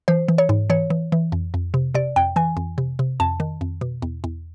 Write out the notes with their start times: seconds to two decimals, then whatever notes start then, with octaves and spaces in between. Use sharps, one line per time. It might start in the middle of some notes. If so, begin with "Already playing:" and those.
0.08 E3 C5
0.28 E3
0.38 C#5
0.49 G#2
0.70 E3 C#5
0.90 E3
1.12 E3
1.32 F2
1.54 F2
1.74 C3
1.95 C3 D5
2.16 F2 G5
2.36 E3 G#5
2.57 F2
2.78 C3
2.99 C3
3.20 F2 A5
3.40 D#3
3.61 F2
3.81 B2
4.02 E2
4.24 E2